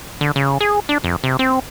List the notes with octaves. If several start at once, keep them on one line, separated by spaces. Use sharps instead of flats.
D3
C#3
G#4
D4
F2
C3
C4